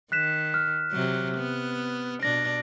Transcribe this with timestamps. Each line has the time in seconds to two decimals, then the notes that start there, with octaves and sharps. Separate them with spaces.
0.12 D#3 F#6 B6 E7
0.54 F6
0.92 C3 F#3
1.37 B3
2.23 B2 D4 A#6